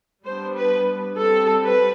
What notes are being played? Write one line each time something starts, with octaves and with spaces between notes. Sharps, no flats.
G3 B3 D4 C5
B4
G3 C4 A4
B4